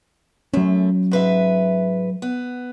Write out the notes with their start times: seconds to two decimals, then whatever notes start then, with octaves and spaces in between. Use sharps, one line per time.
0.53 F#2 F#3 A3 C#4
1.11 G#2 B4 E5
2.22 B3